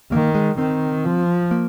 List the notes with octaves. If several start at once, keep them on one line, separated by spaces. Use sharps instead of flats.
D#3 A#3
G#3
D#3 C4
F3
A#3